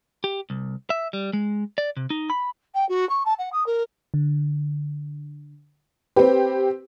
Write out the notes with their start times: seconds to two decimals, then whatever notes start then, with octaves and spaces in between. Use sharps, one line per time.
0.24 G4
0.50 C2
0.90 E5
1.13 G3
1.33 G#3
1.78 D5
1.97 C3
2.10 D#4
2.30 B5
2.74 G5
2.89 F#4
3.09 C#6
3.25 A5
3.38 F#5
3.52 D#6
3.66 A#4
4.14 D3
6.16 C4 G4 B4